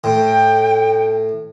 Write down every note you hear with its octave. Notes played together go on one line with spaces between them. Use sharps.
A2 G5